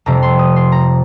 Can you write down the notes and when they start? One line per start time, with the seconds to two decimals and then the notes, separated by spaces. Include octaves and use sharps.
0.06 F2 C3 G3 A#5
0.23 C6
0.39 D#6
0.56 C6
0.72 A#5